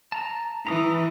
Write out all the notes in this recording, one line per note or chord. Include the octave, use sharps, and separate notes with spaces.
A5 A#5
E3 A#5 D#6